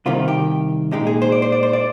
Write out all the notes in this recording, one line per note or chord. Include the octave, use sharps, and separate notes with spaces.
C2 C3 D#3 F4
G4
A#2 G#3 D#4 G4
G#4
C5
D5
C5
D5
C5
D5